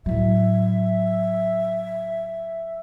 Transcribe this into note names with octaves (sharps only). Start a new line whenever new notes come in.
A2 F#3 E5